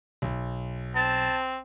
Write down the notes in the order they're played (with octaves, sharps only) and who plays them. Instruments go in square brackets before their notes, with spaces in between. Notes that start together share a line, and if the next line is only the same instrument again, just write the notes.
[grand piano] B1
[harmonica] C4 [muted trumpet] A5